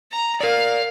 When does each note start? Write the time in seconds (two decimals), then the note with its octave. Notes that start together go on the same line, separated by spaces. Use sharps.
0.12 A#5
0.41 A#4 D5 F5